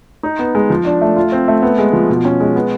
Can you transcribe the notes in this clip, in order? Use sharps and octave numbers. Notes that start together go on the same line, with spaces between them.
D#4
B3
G#3
F3
D4
A3
F4
C4
A3
B3
G#3
F3
B2
C#4
G#3
B3